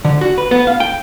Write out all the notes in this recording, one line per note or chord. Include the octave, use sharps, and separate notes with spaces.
D3
F#4
B4
B3
F5
G5